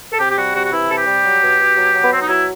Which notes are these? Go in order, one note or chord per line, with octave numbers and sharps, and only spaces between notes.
A4
C3 G4
G4
G3 F#4
C3 F#4
F#4
E3 E4
C3 A4
G4
G3
F#3
B2
B2
F#3
F#3
B3
B2 C4
D#4
F#3 E4